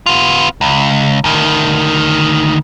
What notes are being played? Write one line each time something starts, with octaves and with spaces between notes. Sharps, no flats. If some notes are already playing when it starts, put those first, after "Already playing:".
B3 F4
C#2
D2 D#3